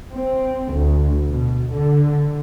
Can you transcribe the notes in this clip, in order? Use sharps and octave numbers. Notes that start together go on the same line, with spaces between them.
C4
D2
B2
D3